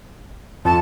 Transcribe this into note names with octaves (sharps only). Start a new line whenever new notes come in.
F2 A5